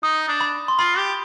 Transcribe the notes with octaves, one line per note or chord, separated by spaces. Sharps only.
D#4 D#6
D4
B5
C6
F4 B5
G4